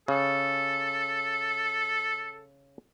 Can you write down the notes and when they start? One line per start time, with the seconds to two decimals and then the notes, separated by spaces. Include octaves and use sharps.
0.08 C#3 A4